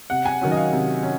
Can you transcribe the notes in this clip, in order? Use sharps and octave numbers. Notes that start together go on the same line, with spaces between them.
C3 F#5
G#5
D#3 F#3 C#4
D#5
F5
C3
C#4